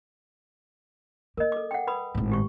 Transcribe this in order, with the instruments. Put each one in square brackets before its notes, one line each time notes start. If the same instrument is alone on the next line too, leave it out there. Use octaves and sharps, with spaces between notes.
[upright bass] A#3 [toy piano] A#4 D#5
[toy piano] A4 D6
F#5 G5
B4 B5 D#6
[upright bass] G#1 A2
[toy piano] G4 C#6